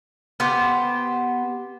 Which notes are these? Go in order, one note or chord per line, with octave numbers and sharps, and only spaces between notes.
B3 G4 C5